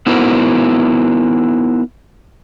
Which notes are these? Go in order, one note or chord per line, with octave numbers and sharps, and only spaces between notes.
B3 D#4 E4 F#4 A#4 C5